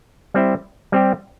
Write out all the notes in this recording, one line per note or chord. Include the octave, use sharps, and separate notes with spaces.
G3 C4 E4
G3 C4 G4